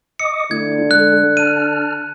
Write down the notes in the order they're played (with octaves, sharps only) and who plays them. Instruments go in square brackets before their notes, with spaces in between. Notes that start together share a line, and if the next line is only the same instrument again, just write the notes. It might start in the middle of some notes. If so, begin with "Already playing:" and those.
[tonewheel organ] D#5 D6 D#6 [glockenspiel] C#7
[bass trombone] D3 [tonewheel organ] A3 E4 [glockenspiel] G#6
[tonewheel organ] G#3 A4 [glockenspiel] F#6
[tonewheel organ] A5 F6 [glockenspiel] D#7